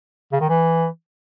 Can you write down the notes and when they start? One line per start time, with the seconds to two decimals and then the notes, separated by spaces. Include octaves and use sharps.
0.33 C#3
0.41 D#3
0.49 E3